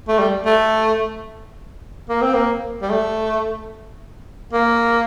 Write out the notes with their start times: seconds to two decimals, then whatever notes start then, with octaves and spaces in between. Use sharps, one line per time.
0.08 A3
0.19 G3
0.46 A3
2.09 A#3
2.22 C4
2.34 A#3
2.82 G3
2.90 A3
4.53 A#3